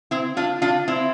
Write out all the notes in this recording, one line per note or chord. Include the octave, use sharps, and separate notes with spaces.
C4 E4
D4 F4
D4 F4
C4 E4